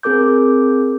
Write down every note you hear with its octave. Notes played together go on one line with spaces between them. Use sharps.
C4 G#4 A#4 D6 G6